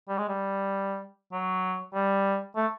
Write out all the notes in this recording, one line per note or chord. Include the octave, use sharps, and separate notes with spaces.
G3
G#3
G3
F#3
G3
A3